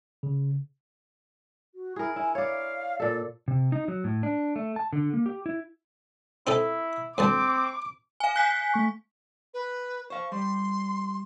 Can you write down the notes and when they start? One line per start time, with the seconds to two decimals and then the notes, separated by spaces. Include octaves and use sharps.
0.23 C#3
1.74 F#4
1.96 E4 G#4 A#4
2.16 E4 G#5
2.35 C#5 D5 F5
3.00 A#2 A4 D5
3.48 C3
3.72 D#4
3.88 F#3
4.04 A2
4.23 D4
4.56 A3
4.76 A5
4.93 D3
5.13 A#3
5.26 G4
5.46 E4
6.47 C4 D#4 E4 A4
7.18 D2 G2 C4 A5 D6
8.20 F5 G#5
8.36 G#5 F#6 G6 B6 C7
8.74 A3 C#6
9.54 B4
10.10 C5 F5 C#6
10.32 G3 C6